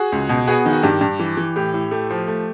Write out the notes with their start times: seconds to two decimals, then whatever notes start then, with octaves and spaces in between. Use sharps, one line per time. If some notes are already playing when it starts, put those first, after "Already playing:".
Already playing: F#4 G#4
0.12 C#2
0.29 B2
0.47 B3 F#4 G#4
0.66 D#3
0.73 F#4
0.83 G2 G4
1.01 G2
1.20 E3
1.37 E3
1.56 A2 G4
1.74 A2
1.91 A3 G4
2.10 F3
2.28 A3